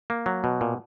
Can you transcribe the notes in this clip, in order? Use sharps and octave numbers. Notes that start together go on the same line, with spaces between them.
A#3
F#3
B2
A#2